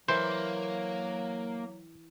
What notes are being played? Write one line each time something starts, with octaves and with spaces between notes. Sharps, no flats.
E3 F#3 A#3 C5